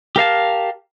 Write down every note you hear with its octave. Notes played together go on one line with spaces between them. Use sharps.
G4 A#4 F5 A5